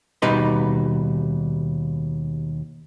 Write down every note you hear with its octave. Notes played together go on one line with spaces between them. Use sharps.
D#2 B2 G3 D#4 B4 C6